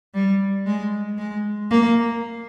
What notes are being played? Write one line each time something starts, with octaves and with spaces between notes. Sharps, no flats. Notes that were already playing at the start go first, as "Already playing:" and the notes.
G3
G#3
G#3
A#3